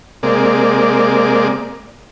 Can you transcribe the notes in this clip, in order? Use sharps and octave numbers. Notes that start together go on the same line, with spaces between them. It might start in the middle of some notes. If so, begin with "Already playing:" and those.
C3 G#3 A#3 D5